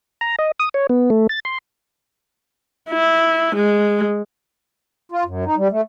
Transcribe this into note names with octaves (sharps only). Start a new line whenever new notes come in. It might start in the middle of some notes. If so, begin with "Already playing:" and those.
A#5
D#5
D#6
C#5
B3
A3
A6
C6
E4
G#3
F4
F#2
D#4
G3
A3